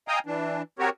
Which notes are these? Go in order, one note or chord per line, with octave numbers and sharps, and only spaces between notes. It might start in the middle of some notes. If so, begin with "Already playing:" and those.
D#5 F5 G5 G#5 A#5 D#6
E3 D4
C4 F#4 G4 A#4 C#5